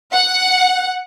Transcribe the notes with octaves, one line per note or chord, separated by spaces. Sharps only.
F#5